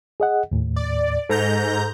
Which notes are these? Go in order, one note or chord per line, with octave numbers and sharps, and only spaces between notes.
G#4 D#5 F#5
D#2 A2
D5
G#2 A4 A#5 G6